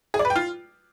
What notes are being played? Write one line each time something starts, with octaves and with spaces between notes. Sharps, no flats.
G#4
D5
B4
G5
F4